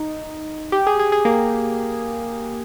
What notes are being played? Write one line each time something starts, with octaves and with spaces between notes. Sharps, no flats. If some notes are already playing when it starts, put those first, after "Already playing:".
Already playing: D#4
G4
G#4
G#4
G#4
A#3